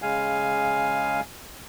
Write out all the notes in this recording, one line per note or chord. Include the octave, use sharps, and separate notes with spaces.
C#3 G#3 F5 G#5